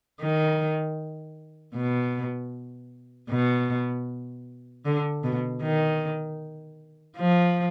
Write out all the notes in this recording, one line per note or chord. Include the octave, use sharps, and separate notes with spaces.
D#3
B2
B2
D3
B2
D#3
F3